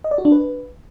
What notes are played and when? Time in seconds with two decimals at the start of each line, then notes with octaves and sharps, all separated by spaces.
0.04 D#5
0.11 D5
0.18 F#4
0.25 D4
0.32 B4